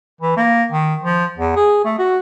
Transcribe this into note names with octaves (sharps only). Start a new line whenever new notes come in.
E3
A#3
D#3
F3
E2
G#4
A3
F#4